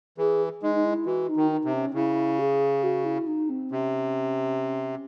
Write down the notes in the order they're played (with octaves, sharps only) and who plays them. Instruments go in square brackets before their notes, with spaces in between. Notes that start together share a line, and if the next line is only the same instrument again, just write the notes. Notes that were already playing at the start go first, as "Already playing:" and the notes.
[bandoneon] E3 [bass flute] G#4
[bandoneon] G#3 [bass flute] D#4
[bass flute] D#4
E4
[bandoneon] E3 [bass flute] F#4
[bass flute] D#4
[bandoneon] D#3
[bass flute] D#4
[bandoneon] C3
[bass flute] C#4
[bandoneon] C#3 [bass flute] E4
[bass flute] G#4
F#4
E4
D#4
C4
[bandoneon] C3 [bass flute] C#4